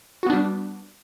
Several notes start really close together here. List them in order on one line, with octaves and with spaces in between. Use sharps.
F#4 B3 D4 G3